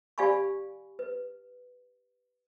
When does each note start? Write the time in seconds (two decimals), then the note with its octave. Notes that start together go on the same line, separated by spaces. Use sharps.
0.18 G4 D5 F5 G#5 B5 C#6
0.99 B4